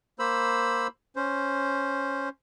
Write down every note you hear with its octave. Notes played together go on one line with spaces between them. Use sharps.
A#3 C5 B5 E6
C#4 C5